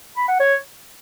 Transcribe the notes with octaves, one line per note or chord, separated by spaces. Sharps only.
B5
F#5
C#5